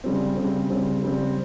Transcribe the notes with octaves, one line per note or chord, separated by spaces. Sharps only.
C#3 G3 C4
C#3 G3 C4
C#3 G3 C4
C#3 G3 C4